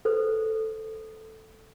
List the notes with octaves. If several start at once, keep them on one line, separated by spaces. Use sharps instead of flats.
A4 B4 C5